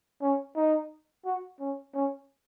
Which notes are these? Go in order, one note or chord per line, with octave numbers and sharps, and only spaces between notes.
C#4
D#4
F#4
C#4
C#4